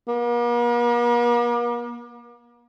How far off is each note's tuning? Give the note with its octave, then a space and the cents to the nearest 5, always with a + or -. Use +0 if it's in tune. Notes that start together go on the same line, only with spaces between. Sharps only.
A#3 +45